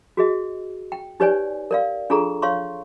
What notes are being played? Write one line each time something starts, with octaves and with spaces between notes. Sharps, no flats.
F#4 G#4 D#5
G5
D#4 G4 B4 C#5 D5 G#5
A#4 D5 F5
D4 F4 G#4 A4 A#5 C#6
C#5 F5 C6 C#6